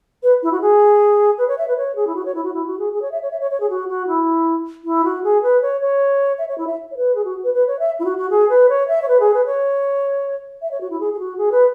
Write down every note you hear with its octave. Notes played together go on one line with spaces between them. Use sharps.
B4
E4
F#4
G#4
B4
C#5
E5
B4
C#5
G#4
E4
F#4
C#5
E4
F#4
E4
F#4
G#4
G#4
C#5
E5
C#5
E5
C#5
C#5
G#4
F#4
F#4
E4
E4
F#4
G#4
B4
C#5
C#5
E5
C#5
E4
E5
C#5
B4
G#4
F#4
B4
B4
C#5
E5
E4
F#4
F#4
G#4
B4
C#5
E5
C#5
B4
G#4
B4
C#5
E5
C#5
F#4
E4
G#4
G#4
F#4
G#4
B4